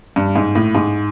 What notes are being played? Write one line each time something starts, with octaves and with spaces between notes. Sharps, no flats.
G2
G#2
A2
G#2